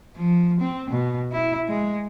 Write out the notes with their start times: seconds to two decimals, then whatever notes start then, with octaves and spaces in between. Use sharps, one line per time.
0.16 F3
0.60 C4
0.90 B2
1.32 E4
1.68 G#3